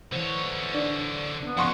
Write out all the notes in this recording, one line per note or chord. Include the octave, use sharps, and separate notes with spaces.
D3 E3 C5 C#5
D4
B3 D4
G#2 C#3 F3 F#5 C6 C#6